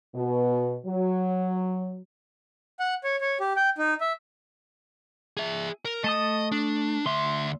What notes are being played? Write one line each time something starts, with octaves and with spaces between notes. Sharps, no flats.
B2
F#3
F#5
C#5
C#5
G4
G5
D#4
E5
G#4 E5
A#4
A3 D#5 A5 D#6
D4
D2 E5 C6